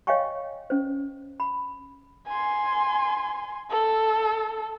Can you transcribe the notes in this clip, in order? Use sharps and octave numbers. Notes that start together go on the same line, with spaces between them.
C#5 D#5 F5 G5 G#5 C#6
C#4 C5
B5
G#5 C6
A4